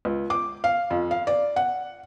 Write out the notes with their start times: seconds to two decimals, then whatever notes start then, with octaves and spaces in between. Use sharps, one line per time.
0.05 C#2
0.30 D6
0.64 F5
0.90 F2
1.11 F5
1.27 D5
1.56 F#5